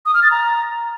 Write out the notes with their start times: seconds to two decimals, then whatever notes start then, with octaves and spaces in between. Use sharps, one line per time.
0.06 D#6
0.14 F6
0.23 A6
0.31 A#5